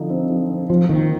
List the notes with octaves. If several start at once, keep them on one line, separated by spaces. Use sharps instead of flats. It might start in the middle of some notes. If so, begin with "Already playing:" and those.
Already playing: D3 F3 C4 D#4
C4
F3
C4
F3 F4
D#3 A#3